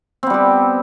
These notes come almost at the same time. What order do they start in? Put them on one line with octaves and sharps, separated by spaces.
C4 B3 G3 G4